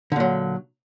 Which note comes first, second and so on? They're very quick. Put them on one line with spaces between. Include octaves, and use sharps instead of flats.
D3 A#2 F#3